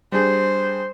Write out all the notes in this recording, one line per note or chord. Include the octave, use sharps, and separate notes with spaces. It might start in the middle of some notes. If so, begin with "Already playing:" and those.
G3 D4 G#4 C5